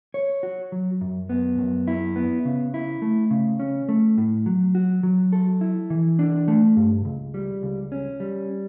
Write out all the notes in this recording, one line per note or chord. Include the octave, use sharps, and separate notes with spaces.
C#5
F#4
F#3
F#2
B3
F#2
E4
B3
C#3
E4
A3
C#3
C#4
A3
A2
F#3
F#4
F#3
A4
E4
E3
D4
A3
G2
C#2
G3
C#2
C#4
G3